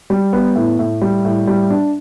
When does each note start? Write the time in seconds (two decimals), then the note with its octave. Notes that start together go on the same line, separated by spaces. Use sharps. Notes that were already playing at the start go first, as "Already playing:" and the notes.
0.10 G3
0.33 B3
0.56 A2
0.79 A2
1.01 G3
1.25 A2
1.47 G3
1.70 D4